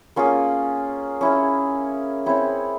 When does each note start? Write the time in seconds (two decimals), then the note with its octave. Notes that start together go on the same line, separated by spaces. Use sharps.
0.16 A#3 C#4 F4 G#4
1.21 C#4 E4 G#4
2.26 C4 E4 G#4 C#5